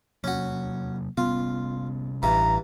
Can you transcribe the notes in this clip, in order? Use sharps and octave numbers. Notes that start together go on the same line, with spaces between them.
C3 F#3 A#3 C#4 F#4
C3 G3 B3 C#4 F4
A1 G2 E3 A#5